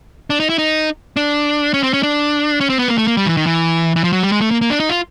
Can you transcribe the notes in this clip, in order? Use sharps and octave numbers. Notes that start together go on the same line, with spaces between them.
D4
D#4
E4
D#4
D4
C#4
C4
C#4
D4
C#4
C4
B3
A#3
A3
A#3
G3
E3
D#3
E3
E3
F3
F#3
G3
G#3
A3
A#3
A#3
D4
D#4
F4